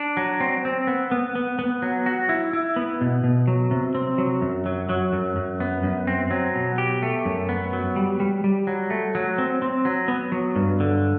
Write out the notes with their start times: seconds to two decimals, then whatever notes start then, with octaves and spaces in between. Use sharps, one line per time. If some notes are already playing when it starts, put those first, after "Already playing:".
Already playing: D4
0.17 F#3
0.40 C4
0.65 C4
0.87 B3
1.11 B3
1.35 B3
1.59 B3
1.82 F#3
2.06 F#4
2.29 E4
2.53 E4
2.76 B3
3.01 B2
3.24 B2
3.48 F#3
3.71 C3
3.95 C4
4.18 F#3
4.41 F#2
4.66 F#3
4.89 F#3
5.13 F#2
5.36 F#2
5.60 B3
5.83 F#2
6.07 C4
6.31 F#3
6.55 B2
6.78 G4
7.02 A3
7.25 F#2
7.49 B3
7.73 F#3
7.96 G3
8.20 G3
8.44 G3
8.67 F#3
8.90 A3
9.15 F#3
9.38 C4
9.62 C4
9.85 F#3
10.08 B3
10.32 F#3
10.56 G2
10.80 D3